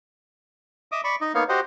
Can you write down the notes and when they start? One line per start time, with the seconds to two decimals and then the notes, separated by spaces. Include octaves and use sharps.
0.92 D#5 E5 D6 D#6
1.04 D5 B5 C#6
1.21 D#4 D#5
1.35 A#3 B3 D#4 C#5 F5
1.49 F#4 G4 C5 D#5 F#5 G5